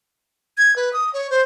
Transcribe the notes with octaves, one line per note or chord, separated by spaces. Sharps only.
G#6
B4
D#6
C#5
C5